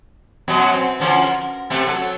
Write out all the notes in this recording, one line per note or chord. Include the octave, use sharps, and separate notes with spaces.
F#2 B2 F#3
C4
D3 F3 C#4
A#4
C3 A3 C4
F#3 A4